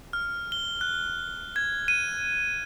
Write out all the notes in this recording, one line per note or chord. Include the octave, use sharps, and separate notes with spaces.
F6
G7
F#6
G#6
D#7